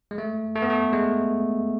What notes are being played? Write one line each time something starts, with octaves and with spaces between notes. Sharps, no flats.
G#3
A3
A3
B3
A3
G#3